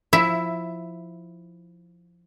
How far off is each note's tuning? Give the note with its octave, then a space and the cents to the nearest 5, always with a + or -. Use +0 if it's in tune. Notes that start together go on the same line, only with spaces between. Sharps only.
F3 +0 E4 +0 E5 +15